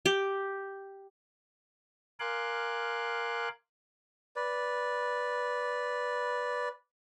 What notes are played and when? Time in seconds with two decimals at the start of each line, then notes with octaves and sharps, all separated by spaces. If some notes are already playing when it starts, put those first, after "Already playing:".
0.06 G4
2.20 A#4 F5 G#5 C6 D6 F#6
4.36 B4 D5